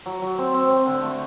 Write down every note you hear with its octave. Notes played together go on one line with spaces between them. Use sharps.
F#3
F#3
C4
C4
C4
D3
A3